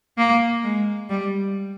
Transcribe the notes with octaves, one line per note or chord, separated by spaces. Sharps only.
A#3
G#3
G3